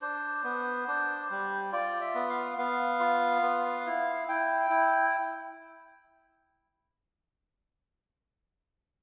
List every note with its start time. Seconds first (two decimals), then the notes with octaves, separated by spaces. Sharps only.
0.02 D4 C5
0.44 B3
0.88 D4
1.30 G3
1.72 F4 D5
2.01 E5
2.15 B3
2.30 F5
2.58 B3 F5
3.00 F4
3.43 B3
3.86 E4
4.28 E4 G5
4.70 E4